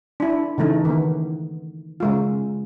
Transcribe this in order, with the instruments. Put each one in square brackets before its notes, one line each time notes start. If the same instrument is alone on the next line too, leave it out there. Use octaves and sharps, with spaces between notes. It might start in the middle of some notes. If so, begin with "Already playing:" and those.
[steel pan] D4 E4
C#3 E3 A3 D#4
D#3 B3
C#3 G#3 F4